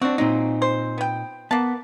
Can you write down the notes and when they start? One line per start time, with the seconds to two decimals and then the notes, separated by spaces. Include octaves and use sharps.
0.02 C4 D4 F#4
0.18 A#2 F#3 C4 D#4
0.62 C5
0.98 B3 G5
1.51 A#3 B3 A5